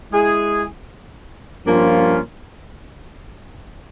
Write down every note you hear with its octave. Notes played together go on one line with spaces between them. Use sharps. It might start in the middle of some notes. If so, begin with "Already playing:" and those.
G#3 E4 G#4
G2 F3 A#3 C#4 F4